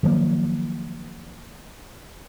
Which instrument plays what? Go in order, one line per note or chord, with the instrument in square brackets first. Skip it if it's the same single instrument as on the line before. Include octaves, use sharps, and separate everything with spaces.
[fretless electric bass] D#3 F3 F#3 A#3